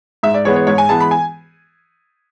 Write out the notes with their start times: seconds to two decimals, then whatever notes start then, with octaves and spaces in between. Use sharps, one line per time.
0.23 G#2 E5
0.34 D5
0.45 E3 G#3 B3 C#5
0.56 C#5
0.67 G#2 C#5
0.78 G#5
0.89 E3 G#3 B3 A5
1.00 B5
1.11 G#5